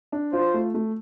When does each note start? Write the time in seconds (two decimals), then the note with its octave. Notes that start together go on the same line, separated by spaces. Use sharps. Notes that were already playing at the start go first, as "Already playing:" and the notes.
0.12 D4
0.33 F4 C5
0.54 A3
0.74 A3